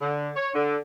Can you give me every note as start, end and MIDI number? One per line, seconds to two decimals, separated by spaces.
0.01 0.30 50
0.36 0.50 73
0.55 0.77 50